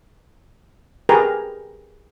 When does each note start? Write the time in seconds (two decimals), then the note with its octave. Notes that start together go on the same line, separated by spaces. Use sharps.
1.09 G4 G#4 A#4 B4 G5 A#5